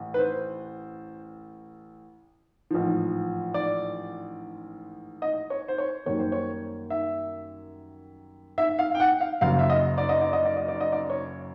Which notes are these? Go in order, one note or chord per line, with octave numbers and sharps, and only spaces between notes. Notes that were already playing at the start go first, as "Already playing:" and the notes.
Already playing: A1
B4
C5
A1 G#2 F3
D5
D#5
C#5
C5
C#5
F#2 D#3 G3 A#3 C#5
C5
C#5
E5
E5
F5
G5
F#5
F5
F#1 F#2 C#3 F5
E5
D#5
D5
D#5
D5
D#5
D5
D#5
D5
D#5
D5
C#5